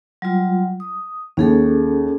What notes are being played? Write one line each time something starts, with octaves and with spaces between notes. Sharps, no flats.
F#3 G3 F4
D#6
D#2 C#4 G#4 A4